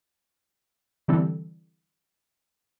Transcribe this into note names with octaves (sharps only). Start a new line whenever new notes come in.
D3 E3 G3 C4 A4